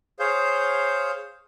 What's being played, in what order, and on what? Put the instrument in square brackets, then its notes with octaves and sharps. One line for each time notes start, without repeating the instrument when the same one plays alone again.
[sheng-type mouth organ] G#4 C5 C#5 F5 G6